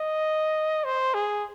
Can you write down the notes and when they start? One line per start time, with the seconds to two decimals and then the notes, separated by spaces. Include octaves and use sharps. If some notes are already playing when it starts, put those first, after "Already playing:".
Already playing: D#5
0.84 C5
1.14 G#4